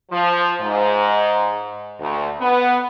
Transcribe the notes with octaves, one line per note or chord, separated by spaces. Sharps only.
F3
G#2
D2
B3